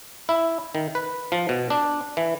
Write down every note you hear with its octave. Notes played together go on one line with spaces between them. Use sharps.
E4
D#3
B4
F3
B2
D4
E3